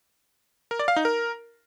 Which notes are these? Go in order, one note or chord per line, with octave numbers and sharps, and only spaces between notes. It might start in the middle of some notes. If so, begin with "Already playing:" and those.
A#4
D5
F5
D#4
A#4